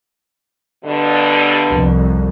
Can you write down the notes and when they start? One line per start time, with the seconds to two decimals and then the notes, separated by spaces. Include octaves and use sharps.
0.83 G2 B2 D3
1.69 C2 F2